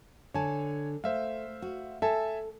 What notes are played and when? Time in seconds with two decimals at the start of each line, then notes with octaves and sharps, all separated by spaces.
0.34 D3 C#5 G#5 A5
1.04 A3 C5 E5 F5
1.62 F#4
2.02 A4 E5 G#5 A5